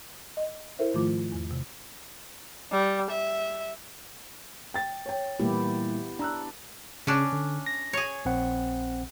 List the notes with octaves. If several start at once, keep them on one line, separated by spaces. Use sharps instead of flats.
D#5
E4 A4 A#4 C5 E5
G#2 D#3 F3 A3 F4 D6
E2
E2 C3
G3
E5
G5 A6
C#5 G5
A#2 E3 G3 B3 E4 G4
D4 A#5 E6 F#6
C#3 C#4 D4
D3
A#6
G#4 C#5
A#1 C4 F#5